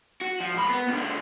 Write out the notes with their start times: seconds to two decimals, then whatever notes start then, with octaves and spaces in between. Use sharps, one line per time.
0.21 F#4
0.41 F3
0.55 G#2 B5
0.70 B3
0.88 C#2 D3